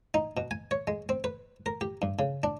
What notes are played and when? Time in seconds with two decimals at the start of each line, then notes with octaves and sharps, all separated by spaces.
0.14 D#4
0.37 B2
0.51 G#5
0.71 C#5
0.87 G#3
1.09 C4
1.24 B4
1.66 A#4
1.81 G4
2.02 G2
2.19 C#3
2.43 D4